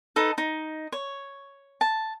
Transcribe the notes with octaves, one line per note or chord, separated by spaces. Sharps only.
D#4 A4 B4
D#4
C#5
A5